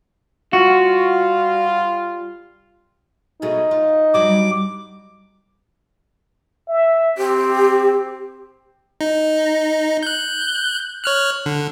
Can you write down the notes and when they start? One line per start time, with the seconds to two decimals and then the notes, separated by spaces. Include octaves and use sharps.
0.53 G3 F4 F#4
3.42 B2 G#3 A3 D#4
3.71 F4
4.14 G2 F#3 G3 D6
6.68 E5
7.18 C4 G4
9.01 D#4
10.03 F#6 G6
11.04 C#5 F6 F#6
11.46 D3